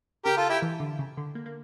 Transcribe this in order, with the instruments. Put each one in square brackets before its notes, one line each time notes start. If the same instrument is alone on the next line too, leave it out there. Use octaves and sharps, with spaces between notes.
[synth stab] C#3 [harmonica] G4 A#4
[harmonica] F4 A4
E4 G4
[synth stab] E3
D3
C#3
D3
A#3
A#3